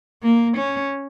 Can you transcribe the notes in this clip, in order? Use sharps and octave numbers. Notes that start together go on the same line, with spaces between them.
A#3
C#4